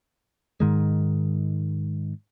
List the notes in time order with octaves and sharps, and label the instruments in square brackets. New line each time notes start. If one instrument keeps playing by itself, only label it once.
[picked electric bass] G#2 D#3 G#3